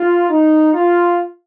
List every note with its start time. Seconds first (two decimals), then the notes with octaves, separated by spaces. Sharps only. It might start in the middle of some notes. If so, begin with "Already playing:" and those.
Already playing: F4
0.29 D#4
0.73 F4